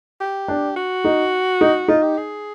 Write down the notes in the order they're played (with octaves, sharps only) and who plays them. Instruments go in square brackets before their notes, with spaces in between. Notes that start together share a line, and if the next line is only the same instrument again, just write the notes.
[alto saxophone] G4
[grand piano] D4
[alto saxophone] F#4
[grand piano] D#4
D#4
[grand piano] D#4 [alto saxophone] F4
[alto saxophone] G4
G#4